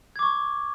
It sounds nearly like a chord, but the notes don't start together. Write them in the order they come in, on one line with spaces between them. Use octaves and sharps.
G#6 D6 C#6